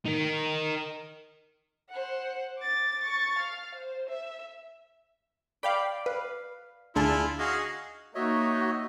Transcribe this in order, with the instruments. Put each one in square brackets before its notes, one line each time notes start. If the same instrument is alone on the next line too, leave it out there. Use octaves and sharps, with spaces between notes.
[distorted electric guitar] D#4 A#4
[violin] C5 F#5
D6 A6
C#6 A6
F5
C5
E5
[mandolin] D5 [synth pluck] F5 G5 B5
[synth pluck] B4 [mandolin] F5
[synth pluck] D2 D4 A5 [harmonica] E4 F4 [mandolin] G#4
[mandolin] D#4 [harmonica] F#4 G#4 F5
[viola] A#3 D#4 [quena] F#4 [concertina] C#5 D#5 E5